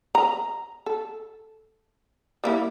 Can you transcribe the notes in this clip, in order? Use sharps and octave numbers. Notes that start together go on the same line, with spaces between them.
A#5
A4
G3 A#3 E4